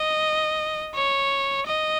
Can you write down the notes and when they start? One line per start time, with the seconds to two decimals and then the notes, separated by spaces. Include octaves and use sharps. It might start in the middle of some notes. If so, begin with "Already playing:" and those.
Already playing: D#5
0.95 C#5
1.67 D#5